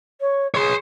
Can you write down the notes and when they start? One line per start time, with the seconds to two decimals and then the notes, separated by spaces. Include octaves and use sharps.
0.20 C#5
0.55 G#4 C#5 C6